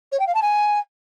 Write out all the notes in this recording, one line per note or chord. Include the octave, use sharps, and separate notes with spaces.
C#5
G5
F5
A5
G#5